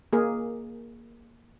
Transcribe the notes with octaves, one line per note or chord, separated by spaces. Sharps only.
A#3 G#4 A#4